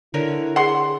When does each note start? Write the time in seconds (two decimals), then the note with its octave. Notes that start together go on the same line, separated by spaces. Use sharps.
0.14 D3 E4 A#4 C#5
0.56 G#4 F#5 C6